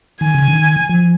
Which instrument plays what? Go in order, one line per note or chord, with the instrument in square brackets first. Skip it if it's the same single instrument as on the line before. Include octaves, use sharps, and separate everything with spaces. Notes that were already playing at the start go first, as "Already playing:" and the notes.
[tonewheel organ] D#3 [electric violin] G#5
[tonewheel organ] C#3
D#3
F3